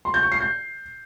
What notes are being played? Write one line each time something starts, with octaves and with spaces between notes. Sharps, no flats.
C6
G6
C#6
C7
G6